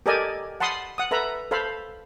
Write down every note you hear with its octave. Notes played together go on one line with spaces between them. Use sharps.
G4 A4 A#4 D5 D#5 G#5
F#5 A5 B5 C6 D#6
F#5 D#6
A4 B4 E5 A#5 B5
A4 C5 F5 B5